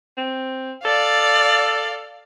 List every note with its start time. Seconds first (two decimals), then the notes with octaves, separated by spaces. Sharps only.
0.18 C4
0.85 A4 D5 F5